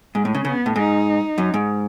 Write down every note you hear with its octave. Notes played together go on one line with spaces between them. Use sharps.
G#2 G#3
A2
C#3
C#3 B3
A2
G#2 D#4
F#2
G#2